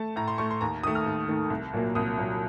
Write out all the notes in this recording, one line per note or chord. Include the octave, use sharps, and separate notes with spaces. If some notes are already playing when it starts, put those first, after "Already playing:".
Already playing: A3 A5
A2 A#5
C6
A3 C#6
C6
D#2 A#5
D#3 A3 D#6
F6
D#2
D#3 A3
C2
A#2 F#3 A#3
C2 D#6
A#2 F#3 A#3